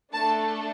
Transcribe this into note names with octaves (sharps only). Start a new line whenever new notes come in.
A3 D4 A4 A5